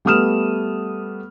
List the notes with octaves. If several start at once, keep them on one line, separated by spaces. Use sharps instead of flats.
G3 A3 B3 D#6 F6 E7